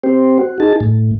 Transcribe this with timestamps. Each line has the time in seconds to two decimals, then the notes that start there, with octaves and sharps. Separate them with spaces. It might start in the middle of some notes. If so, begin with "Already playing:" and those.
0.04 C4 G4 C5
0.38 F#4
0.60 D#4 G#4 A5
0.80 A2